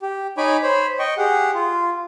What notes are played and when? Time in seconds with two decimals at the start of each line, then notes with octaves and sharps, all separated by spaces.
0.02 G4
0.38 D#4 C#5 G#5 B5 D6
0.63 C5 C#5 B5
0.99 D#5 G5 C#6
1.18 G4 G#4 F#5
1.54 F4